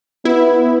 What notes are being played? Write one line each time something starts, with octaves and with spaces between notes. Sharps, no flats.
B3 E4